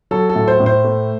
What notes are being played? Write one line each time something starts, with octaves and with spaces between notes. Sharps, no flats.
F#3 A4
A4
A2
C5
A2
C5
A3